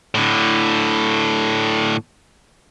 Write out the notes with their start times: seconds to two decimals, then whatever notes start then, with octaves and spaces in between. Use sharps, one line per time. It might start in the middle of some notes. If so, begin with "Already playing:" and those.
0.15 A2 D3